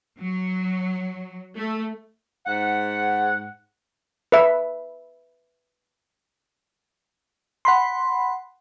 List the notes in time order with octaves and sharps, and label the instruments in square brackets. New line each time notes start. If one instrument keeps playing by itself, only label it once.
[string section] F#3
A3
[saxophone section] G#2 F#5
[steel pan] B4 E5
[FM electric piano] F#5 B5 C6